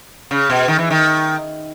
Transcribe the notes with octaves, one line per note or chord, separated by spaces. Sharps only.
C#3
B2
D#3
E3
D#3